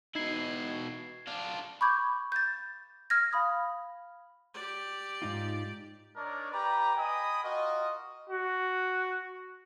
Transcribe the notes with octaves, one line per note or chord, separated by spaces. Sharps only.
B2 D#4 E4 G#6 C7
D4 F4
B5 C#6 D6 G6 G#6
G6 A6
F6 G#6 A#6
F5 B5 D#6
G4 D5
G#2 D#4 F4
D4 D#4 A#4 C#5 D5
G4 B4 D5 A#5
D#5 G5 G#5 B5 D#6
F4 F#4 A#4 D#5
F#4